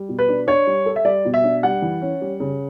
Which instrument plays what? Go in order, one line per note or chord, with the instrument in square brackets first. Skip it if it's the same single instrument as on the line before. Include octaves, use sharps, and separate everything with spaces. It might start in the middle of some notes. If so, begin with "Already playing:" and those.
Already playing: [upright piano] G3
B2
[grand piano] B4
[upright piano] D4
[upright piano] D4 [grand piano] C#5
[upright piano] G3
A4
[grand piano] E5
[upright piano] G3 [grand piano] D5
[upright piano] B2
[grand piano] E5
[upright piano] D4
[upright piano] G3 [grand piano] F#5
[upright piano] E3
C#4
G3
C#3